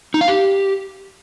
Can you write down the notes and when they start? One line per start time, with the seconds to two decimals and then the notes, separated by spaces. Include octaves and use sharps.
0.14 D#4
0.21 F5
0.28 G4